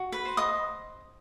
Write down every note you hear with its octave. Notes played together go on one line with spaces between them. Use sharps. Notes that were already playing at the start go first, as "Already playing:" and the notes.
Already playing: F#4
B4 B5
C5
D#5 D#6